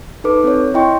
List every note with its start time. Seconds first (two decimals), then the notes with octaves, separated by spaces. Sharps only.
0.24 D#4 A4 B4 D6
0.44 C4 C#5
0.74 E4 D#5 G5 C6 C#6